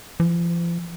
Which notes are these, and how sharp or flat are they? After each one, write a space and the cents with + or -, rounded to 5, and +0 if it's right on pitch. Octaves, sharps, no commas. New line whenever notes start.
F3 -40